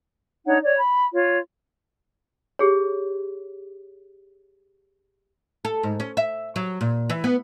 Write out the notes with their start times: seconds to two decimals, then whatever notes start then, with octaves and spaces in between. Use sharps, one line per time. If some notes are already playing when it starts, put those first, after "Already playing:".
0.46 D4 D#4 C#5 F#5
0.63 C#5 D5
0.78 B5
1.12 F4 C#5
2.59 G4 G#4 C#5
5.65 A4
5.83 G#2
6.00 C#4
6.17 E5
6.56 F#3
6.81 A#2
7.10 E3
7.24 B3